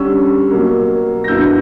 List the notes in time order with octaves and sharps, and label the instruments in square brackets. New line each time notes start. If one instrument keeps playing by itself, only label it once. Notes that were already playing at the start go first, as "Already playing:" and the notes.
Already playing: [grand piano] D3 G3 C#4 E6
B2 F#3 A#3
A#6
G2 D3 F#3 B3 E4 E6 G6